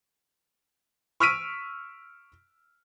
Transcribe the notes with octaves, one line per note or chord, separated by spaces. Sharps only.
C#6 E6 F6 B6 D7 D#7